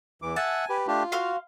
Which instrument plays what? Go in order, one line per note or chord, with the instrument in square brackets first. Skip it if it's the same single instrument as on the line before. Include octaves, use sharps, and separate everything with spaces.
[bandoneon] E2 E3 D6
[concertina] E5 F#5 [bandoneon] G#5 [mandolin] A5
[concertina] G4 B4
[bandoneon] A3 D4 G4 [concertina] F4
[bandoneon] F#4 [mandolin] F5 C6 F6